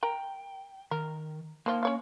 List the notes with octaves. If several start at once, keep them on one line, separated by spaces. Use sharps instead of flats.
A#4 G5 A#5
D#3 A#4
D#3 F3 A#3 F4
C#4 C#5 F5